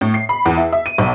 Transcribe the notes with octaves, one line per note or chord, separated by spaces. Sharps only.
A2
C7
B5
E2
E4
E5
D#7
B1